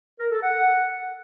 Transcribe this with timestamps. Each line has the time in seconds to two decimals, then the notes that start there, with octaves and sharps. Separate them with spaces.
0.19 A#4
0.31 A4
0.43 F#5